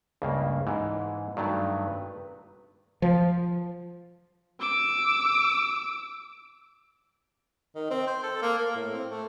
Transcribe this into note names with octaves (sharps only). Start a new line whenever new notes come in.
C#2 G2 C#3 A#3
G#2 E3
G2 D#3 F#3 A3
B4
F3
D6 E6
D#3
C4
C5
A4
A#3
A#3
A2
C4
A3